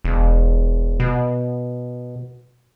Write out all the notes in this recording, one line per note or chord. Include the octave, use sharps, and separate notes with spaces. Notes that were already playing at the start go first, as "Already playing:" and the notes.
E1
B2